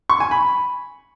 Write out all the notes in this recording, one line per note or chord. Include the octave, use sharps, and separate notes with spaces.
C#6
G#5
B5